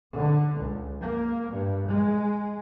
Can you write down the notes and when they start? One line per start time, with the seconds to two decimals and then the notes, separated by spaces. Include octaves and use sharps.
0.18 D3
0.61 C#2
1.02 A#3
1.52 G2
1.87 G#3